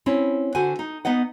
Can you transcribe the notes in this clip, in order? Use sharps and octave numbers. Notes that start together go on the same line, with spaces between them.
C4 C#4 E4
D3 F#4 C5 F#5 G#5
D#4
B3 D#4 D#5 F#5